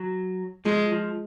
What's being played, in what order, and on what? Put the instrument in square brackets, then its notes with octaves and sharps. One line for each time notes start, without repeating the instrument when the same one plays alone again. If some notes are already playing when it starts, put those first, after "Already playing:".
Already playing: [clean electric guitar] F#3
[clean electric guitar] F3 [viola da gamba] G#3
[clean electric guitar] F3